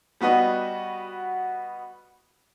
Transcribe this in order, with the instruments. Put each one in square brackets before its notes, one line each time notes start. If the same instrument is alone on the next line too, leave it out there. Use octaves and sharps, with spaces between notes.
[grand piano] G3 B3 F#4 B4 D#5